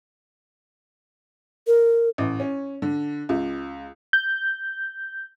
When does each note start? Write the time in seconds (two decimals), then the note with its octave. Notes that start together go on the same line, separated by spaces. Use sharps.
1.67 A#4
2.18 A1
2.40 C#4
2.82 D3
3.29 C#2
4.13 G6